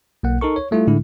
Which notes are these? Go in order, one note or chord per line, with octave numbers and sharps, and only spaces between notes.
B1 A#3 F#5
D#4 A4 A#4 C#6
C#5
G3 A3 E4 F4
A2 D3 G#3 E4